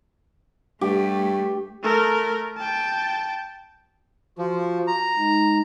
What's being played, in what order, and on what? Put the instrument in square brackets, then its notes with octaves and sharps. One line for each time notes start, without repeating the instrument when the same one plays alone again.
[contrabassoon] G2 [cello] A3 [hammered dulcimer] G4
[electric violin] A3 A#4
G5 A5
[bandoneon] F3 [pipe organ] F4 F#4
[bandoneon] A#5
[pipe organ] G#3 D#4